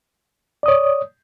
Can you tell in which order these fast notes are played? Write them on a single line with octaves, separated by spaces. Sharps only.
D5 D#6 C#5